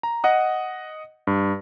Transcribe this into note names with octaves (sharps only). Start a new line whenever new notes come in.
A#5
D#5 F#5 D#6
G2